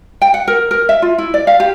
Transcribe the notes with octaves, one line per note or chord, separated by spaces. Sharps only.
G5
F#5
A#4
A#4
E5
F4
E4
D5
F5
G4